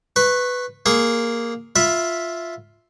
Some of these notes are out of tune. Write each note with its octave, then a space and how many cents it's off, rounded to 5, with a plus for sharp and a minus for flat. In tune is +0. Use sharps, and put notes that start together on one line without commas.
B4 +5 C#6 -20
A#3 +0 G#4 +0 C6 +35
F4 +0 E5 +0 B5 +0